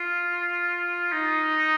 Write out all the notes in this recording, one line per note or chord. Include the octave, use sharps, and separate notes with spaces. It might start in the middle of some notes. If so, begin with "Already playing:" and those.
Already playing: F4
D#4